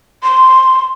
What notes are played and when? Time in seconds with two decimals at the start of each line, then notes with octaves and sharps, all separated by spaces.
0.23 C6